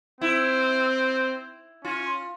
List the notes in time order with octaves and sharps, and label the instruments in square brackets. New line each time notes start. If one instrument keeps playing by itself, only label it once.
[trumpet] C4 [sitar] E4
[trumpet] C#4 [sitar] F4